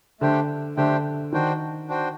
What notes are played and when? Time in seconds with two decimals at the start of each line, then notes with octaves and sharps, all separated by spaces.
0.20 D3 A3 D4 G4 C5 G5
0.76 D3 A3 D4 G4 C5 G5
1.32 D#3 D4 F#4 C5 G5
1.88 D4 F#4 C5 G5